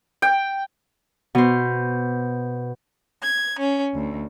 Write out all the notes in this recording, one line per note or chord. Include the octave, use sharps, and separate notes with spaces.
G5
B2 C5
G#6
C#4
D2